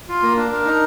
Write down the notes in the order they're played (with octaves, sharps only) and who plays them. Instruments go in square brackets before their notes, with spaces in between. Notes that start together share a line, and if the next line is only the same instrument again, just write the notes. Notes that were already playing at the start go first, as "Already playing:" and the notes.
[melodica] F4
A#3
D4
A#4
D#4